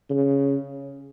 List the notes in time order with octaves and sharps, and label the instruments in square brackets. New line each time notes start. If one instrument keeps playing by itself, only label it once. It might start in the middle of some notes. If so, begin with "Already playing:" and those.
[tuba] C#3